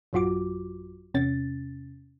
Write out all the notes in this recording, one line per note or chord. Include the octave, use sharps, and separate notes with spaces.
A1 F#2 F#3 F4 F#4 D6
E2 C3 C#4 A6